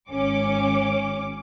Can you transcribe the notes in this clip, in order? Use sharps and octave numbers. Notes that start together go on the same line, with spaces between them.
G#1 C#4 D6